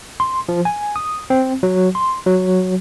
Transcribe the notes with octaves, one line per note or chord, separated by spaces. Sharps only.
C6
F3
G#5
D#6
C4
F#3
C6
F#3